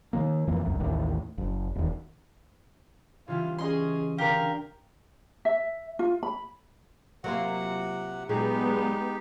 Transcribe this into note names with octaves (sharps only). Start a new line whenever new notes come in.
D#3 F3 A#3
F2 E3 A#3
E1 C2 F#2
A1 D#2 A2
F#1
E1 D#2
C#3 E3 G3 F4
C#4 G#4 D#5 C6
D3 G4 A#4 F5 A#5
E5
F4
B5
C3 F#3 A#3 F4 F#5
A#2 F#3 G#3 B3 D#4 G4 G#4